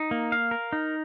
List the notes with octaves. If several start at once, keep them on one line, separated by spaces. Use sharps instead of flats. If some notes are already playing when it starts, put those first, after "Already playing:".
Already playing: D#4
A#3
F5
A#4
D#4